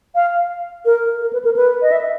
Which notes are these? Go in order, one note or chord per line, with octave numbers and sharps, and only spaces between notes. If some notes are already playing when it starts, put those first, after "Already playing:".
F5
A#4
A#4
B4
A#4
B4
D#5
E5